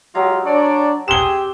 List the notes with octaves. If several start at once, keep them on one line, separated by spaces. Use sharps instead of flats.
F#3 G#3 F4 G4 D#6
D4 C#5 D5
C4 G4 G#4 E7 G7